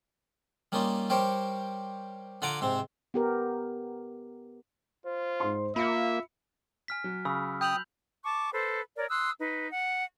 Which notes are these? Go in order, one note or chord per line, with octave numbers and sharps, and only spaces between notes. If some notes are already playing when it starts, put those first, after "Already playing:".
G3 A#3 C#4 D#4 F4
G3 G4 A#4 C5 C#5
D3 F4 F#5 G#5 A#5 D6
G#2 C3 C4
B3 G4 A#4
F4 C5
G#2 C6
A#3 F4 E5 B5 C#7
G#5 F6 B6
F#3
C#3 B5 E6
G5 D#6 G6 F7 F#7
A5 C#6 D6
A4 B4 C5
A#4 C#5 D5
C6 D#6 E6 F#6
D#4 B4
F#5